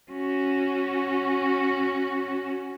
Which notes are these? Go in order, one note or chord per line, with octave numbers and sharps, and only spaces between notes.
C#4 F#4